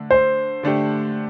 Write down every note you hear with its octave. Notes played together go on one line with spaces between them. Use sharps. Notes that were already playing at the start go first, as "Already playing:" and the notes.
Already playing: D3 A3 D4
C5
D3 A3 D4 G4